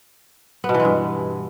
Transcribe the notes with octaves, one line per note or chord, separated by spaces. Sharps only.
B3
B2
E3
G#3
G2